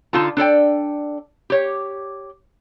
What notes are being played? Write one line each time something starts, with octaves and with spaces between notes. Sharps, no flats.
D3 D#4 F4 A4 A5
D4 A4 D5 G5
G4 C#5